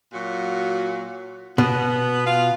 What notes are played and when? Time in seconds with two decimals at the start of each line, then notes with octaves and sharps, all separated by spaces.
0.13 A#2 F#3 F#4
1.58 B2 B3
2.27 F4 F5